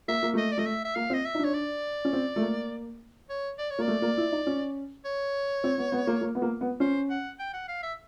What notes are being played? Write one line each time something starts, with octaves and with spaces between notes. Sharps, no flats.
A#3 E5
A#3
A3 D#5
D5
A3 D#5
E5
E5
A#3 F5
C4
D#5
E5
D#4
D4 C#5
D5
C#4
C4
A3
A#3
C#5
D5
C#5
A#3 D5
A3
A#3
E4
D#4
C#4
C#5
C4
B3
B3
A#3
A#3
B3
A#3
B3
C#4 C5
F#5
G5
F#5
F5
E5